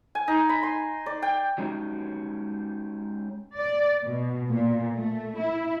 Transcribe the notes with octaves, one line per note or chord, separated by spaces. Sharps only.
G#5
D#4
B5
C6
D5
G5
F#3 G#3 C#4 D#4 F#4 G4
D5
B2
A#2
A3
E4